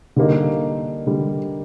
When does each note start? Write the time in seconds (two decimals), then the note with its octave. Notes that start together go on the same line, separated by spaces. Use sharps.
0.16 D3 G3 A#3 D#4
1.07 D3 G3